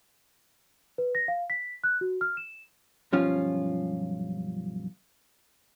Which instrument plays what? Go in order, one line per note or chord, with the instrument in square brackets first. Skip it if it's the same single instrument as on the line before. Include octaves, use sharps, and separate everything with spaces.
[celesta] B4
A#6
F5
B6
F#6
F#4
F6
E7
[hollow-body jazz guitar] B1 G2 F3 C#4 F4